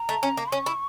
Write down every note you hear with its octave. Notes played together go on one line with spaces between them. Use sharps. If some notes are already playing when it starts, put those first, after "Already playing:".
Already playing: A#5
A3
C#4
A#3
C#4 C#6
E4